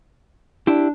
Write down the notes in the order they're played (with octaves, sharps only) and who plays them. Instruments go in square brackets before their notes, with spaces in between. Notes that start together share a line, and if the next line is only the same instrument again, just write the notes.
[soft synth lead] D4 [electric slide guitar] E4 G4